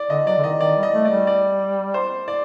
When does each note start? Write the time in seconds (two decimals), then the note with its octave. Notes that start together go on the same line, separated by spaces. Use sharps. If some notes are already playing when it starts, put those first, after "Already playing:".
Already playing: D5
0.10 D3 D#5
0.27 F#3 D5
0.38 D3
0.44 D#3 D#5
0.61 D#3 D5
0.77 G3
0.83 D#5
0.93 A3
1.05 D5
1.11 G3
1.27 D5
1.94 C5
2.28 D5